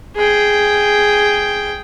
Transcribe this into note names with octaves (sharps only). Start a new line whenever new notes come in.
G#4 G5